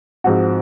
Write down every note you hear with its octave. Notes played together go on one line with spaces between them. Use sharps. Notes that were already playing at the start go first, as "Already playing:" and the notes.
G#2 F3 C4 F#4